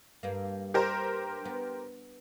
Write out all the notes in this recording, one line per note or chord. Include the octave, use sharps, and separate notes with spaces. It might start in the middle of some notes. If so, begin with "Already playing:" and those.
G2 A#3
G4 A#4 C5
B3